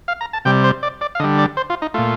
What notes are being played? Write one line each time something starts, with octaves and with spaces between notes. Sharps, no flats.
F5
A#5
A5
C3 G3 G5
C5
D5
D5
F5
D3 G3 D#5
D5
C5
F4
D#4
A#2 A3 F4